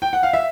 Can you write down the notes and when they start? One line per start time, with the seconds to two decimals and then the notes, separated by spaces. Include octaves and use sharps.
0.02 G5
0.13 F#5
0.23 F5
0.33 E5